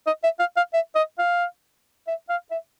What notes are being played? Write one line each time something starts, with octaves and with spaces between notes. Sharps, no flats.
D#5
E5
F5
F5
E5
D#5
F5
E5
F5
E5